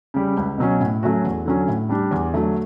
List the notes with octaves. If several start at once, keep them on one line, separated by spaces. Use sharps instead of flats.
C#3 G3
C#2
B2 F#3 C#4
A2
F#3 A3 C#4 F#4
E2
D3 F#3 C#4
A2
G3 D4 G4
E2
D3 F#3 A3